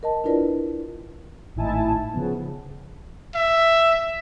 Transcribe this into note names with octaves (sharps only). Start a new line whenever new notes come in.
A#4 D#5 A5
D4 E4 F4 A#4 B4 D5
G#1 A2 D#4 E4 G#5 A5
C#3 F3 B3
E5